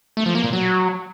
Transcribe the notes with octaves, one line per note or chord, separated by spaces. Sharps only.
A3
F3
A#3
A#2
F#3